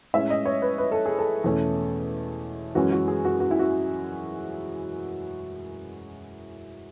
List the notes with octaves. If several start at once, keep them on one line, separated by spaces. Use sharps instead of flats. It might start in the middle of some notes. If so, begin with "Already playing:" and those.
A2 G#3 C#4 E5
D#5
C#5
B4
B4
A4
G#4
A4
E2 B2 A3 C#4
F#2 E3 G#3 C#4 F#4
F#4
G#4
F#4
F#4
E4
F#4